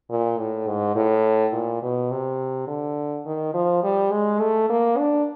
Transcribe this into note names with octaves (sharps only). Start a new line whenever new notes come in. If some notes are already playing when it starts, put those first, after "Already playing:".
A#2
A2
G#2
A2
A#2
B2
C3
D3
D#3
F3
G3
G#3
A3
A#3
D4